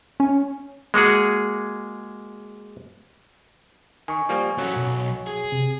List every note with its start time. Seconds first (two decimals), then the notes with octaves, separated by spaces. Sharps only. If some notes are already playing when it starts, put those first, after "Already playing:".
0.20 C#4
0.94 G#3 A#3 F#4 G#4
4.08 D#3 G#5 C#6
4.29 F3 G3 A#3
4.59 F#3 C#4 A4
4.76 B1
5.26 G#4
5.52 C3